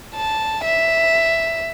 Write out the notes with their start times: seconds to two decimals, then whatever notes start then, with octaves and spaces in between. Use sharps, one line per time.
0.15 A5
0.64 E5